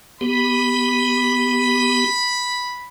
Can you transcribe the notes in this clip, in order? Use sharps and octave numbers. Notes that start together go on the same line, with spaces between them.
B3 G4 B5